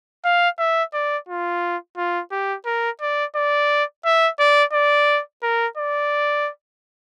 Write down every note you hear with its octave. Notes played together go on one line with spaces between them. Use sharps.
F5
E5
D5
F4
F4
G4
A#4
D5
D5
E5
D5
D5
A#4
D5